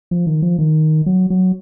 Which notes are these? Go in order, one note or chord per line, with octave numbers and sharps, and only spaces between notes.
F3
D#3
F3
D#3
F#3
F#3